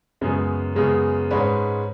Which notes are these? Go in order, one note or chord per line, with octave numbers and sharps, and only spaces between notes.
F#2 C#3 G#3 B3 G#4
F#2 C#3 G#3 B3 G#4
G#2 G#3 C#4 B4